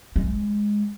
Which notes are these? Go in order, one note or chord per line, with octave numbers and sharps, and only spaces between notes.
G#3